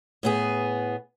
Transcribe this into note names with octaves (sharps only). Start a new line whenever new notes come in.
A2 B3 G#4